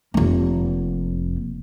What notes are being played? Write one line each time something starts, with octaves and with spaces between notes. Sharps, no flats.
F1 A#3